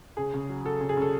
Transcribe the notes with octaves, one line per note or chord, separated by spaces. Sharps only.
C#3 G#4
C#3
F#3
F#3 A4
C#3
G#4
C#3 A4